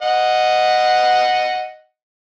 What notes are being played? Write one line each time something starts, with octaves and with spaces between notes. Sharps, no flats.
D#5 F#5